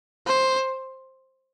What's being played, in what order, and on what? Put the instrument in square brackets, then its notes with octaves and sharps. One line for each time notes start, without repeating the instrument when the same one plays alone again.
[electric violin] C5